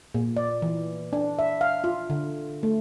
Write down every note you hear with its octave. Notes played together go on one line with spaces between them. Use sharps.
A#2
D5
E3
D4
E5
F5
F4
D3
A3